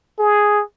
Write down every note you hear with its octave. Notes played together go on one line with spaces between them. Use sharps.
G#4